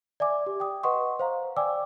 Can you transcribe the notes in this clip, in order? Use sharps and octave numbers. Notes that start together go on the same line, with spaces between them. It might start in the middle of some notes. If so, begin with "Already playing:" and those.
D5 E5 G#5 D6
G4
G5 D#6
B4 D#5 F#5 C6 C#6 D#6
C5 F5 A#5
D5 G5 G#5 D6 E6